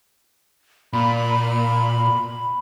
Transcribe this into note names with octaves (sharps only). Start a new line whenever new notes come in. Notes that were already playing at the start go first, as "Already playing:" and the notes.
A#2 B5